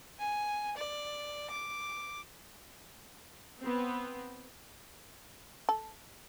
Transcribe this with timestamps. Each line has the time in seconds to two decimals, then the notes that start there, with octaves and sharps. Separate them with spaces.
0.19 G#5
0.77 D5
1.50 D6
3.61 B3 C4
5.69 A4